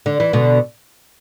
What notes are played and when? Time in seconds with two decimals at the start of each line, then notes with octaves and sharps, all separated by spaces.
0.06 D3
0.20 E3
0.33 B2 D3